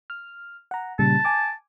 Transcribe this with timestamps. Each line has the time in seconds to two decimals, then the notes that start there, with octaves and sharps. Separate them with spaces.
0.10 F6
0.71 F#5 A#5
0.99 A#2 C#3 G3 A5
1.25 G#5 D6